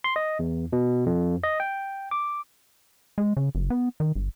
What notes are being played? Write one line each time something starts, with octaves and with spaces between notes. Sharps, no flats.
C6
D#5
E2
B2
F2
D#5
G5
D6
G#3
C#3
F#1
B3
D#3
G1